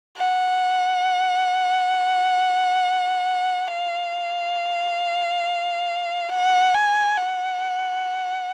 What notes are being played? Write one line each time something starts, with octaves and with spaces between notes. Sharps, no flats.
F#5
F5
F#5
G#5
F#5